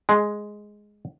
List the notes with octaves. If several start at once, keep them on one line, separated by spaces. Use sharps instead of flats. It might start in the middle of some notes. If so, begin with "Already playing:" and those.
G#3